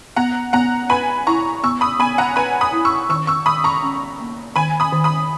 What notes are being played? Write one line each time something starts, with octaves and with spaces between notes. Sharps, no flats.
B3 F#5 A#5
B3 F#5 A#5
B4 G#5 B5
E4 A#5 C#6
B3 C#6 E6
B5 D#6
B3 G#5 B5
F#5 A#5
B4 G#5 B5
B5 D#6
E4
C#6 E6
D#3 C#6 E6
C#6 E6
D#3 B5 D#6
A#5 C#6
C#4
A#3
D#3 G#5 B5
B5 D#6
D#3
B5 D#6